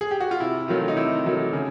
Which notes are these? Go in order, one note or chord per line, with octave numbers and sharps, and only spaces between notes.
G#4
G4
F#4
F4
C3 E4
D#3 F#3 A3 F4
D#4
C3 E4
D#3 F#3 A3
C#3